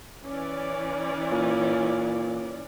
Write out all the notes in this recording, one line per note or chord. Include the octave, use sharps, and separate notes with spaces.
E3 C#4 D5
A#2